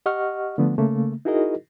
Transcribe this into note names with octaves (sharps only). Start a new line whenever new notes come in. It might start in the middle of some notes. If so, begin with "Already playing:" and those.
G4 D#5 F#5 C#6 F6
D3 F3 A3 B3
C#3 A3 A#3
D#4 E4 F#4 G#4 A#4 D#5